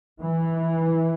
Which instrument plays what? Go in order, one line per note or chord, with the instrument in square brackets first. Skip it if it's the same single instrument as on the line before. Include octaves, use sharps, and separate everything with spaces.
[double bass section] E3